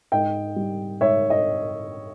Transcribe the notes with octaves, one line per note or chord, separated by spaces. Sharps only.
G#2 D#5 G5
G3
G#2 C#5 E5
D#5